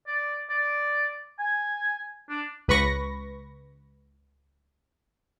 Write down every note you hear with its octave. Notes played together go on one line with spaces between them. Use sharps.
D5
D5
G#5
D4
C#2 B4 B5 C#6 A#6